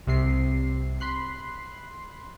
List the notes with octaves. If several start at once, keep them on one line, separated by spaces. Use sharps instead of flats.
C2 C3 C7
B5 C6 F#6 C7